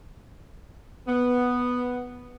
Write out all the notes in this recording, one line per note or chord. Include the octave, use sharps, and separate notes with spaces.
B3